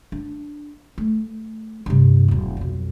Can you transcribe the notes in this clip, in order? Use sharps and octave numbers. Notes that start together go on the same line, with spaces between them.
D4
A3
G2 C3
E1 B1
B1 F2